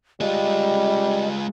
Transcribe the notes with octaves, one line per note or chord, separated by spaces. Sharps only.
G3 G#3 F4 D#5